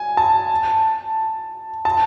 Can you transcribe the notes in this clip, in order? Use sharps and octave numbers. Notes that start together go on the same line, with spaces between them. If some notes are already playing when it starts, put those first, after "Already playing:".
Already playing: G#5
A5
A5